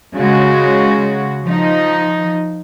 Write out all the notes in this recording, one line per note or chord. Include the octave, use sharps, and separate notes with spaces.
C#3 G#3 F#4
F3 D#4